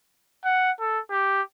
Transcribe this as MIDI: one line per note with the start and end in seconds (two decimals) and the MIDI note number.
0.44 0.71 78
0.80 1.00 69
1.11 1.42 67